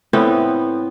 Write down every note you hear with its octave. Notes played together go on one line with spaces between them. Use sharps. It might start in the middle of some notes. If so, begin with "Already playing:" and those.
A2 B3 C4